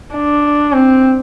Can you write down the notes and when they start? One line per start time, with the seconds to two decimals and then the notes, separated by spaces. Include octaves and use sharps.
0.15 D4
0.73 C4